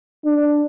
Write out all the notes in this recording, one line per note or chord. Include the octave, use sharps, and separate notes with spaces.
D4